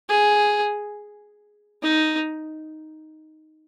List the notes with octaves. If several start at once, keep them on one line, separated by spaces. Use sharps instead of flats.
G#4
D#4